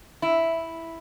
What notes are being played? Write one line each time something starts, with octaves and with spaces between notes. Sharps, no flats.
E4